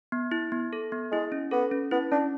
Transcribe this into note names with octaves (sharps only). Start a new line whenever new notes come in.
B3
E4
B3
A4
B3
G#3 E4
C#4
B3 A4
C#4
B3 E4
C#4 D4